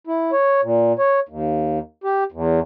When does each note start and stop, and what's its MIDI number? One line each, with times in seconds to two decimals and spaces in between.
0.07 0.31 64
0.32 0.61 73
0.63 0.93 46
0.99 1.20 73
1.29 1.79 39
2.04 2.24 67
2.32 2.60 40